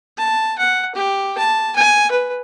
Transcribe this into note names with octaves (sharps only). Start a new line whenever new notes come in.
A5
F#5
G4
A5
G#5
B4